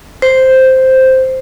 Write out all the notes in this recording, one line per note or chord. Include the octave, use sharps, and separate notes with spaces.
C5